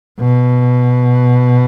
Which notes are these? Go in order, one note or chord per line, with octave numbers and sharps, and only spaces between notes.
B2